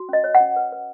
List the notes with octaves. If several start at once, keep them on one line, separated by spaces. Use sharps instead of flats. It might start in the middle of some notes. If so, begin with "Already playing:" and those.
Already playing: F#4
C#4 D#5
C#5
F#5
C#4
B4
B4